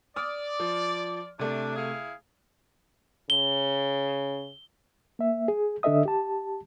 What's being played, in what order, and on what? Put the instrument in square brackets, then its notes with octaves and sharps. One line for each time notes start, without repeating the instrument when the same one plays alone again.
[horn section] D5 [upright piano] D#6 F6
[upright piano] F3
[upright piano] C3 A3 [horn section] D4
[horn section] E4 G#4 F5
[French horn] C#3 [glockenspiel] G7
[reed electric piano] A#3 E5
G#4
D3 D4 A4 D#5 E5 D#6
G4 A5